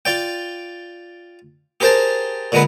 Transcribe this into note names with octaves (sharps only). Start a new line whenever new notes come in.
F4 D5 G5
G4 G#4 A#4 C5 G5 A5
A#2 D3 G#3 A#4 B4 F#5